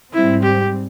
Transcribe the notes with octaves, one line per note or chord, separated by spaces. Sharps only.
G#2 G3 C4 E4
G4